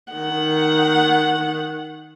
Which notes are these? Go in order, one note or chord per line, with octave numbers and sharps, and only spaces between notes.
D#3 F#5